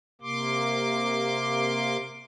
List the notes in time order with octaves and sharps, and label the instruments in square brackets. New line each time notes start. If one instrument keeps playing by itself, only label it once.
[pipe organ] C3 A#3 C6 D6